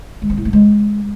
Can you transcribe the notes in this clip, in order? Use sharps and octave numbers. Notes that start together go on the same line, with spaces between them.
G#3
C4
A2
A3
G#3